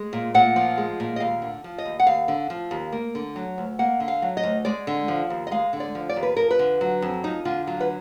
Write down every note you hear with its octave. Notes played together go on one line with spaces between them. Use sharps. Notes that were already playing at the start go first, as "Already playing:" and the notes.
Already playing: G#3
A#2
A#2 F#5
F3
G#3
A#2
D#5
D#2 F5
D3
F3
D#5
D#2
F#5
D#2 F5
D3
F3
D#2
A#3
D3
F#3
D2
A#3 F#5
D3
F5
F#3
D#5
D2
G#3 D5
D3
F3
D#2
D#5
G#3 F5
D3
D5
F3
D5
D#2
B4
F2 A#4
B4
D3
F#3
F2
F2 D#4
D3 F4
F#3 F4
B4